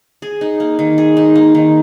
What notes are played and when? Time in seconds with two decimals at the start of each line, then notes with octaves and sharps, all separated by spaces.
0.22 G#4
0.41 D#4
0.60 A#3
0.79 D#3
0.98 G#4
1.17 D#4
1.36 A#3
1.55 D#3